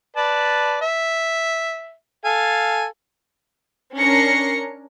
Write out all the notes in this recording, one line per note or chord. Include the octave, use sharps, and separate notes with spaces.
B4 D5 A5
E5
A4 F5 G#5
C#4 D4 A#4 A#6 C7 C#7